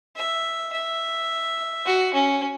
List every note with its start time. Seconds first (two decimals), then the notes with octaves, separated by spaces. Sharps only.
0.16 E5
0.73 E5
1.86 F#4
2.14 C#4